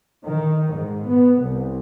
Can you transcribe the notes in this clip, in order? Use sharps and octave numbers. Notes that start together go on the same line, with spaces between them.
D#3
G#2
B3
C2